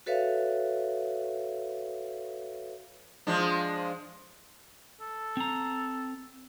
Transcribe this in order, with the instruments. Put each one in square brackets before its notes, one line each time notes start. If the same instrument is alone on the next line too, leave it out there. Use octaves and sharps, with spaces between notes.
[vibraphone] F#4 A4 B4 C#5 E5 F5
[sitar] F3 G#3 D4
[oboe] A4
[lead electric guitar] C4 A#5